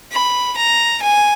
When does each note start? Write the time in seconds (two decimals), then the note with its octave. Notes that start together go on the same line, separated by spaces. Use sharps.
0.12 B5
0.57 A#5
1.02 G#5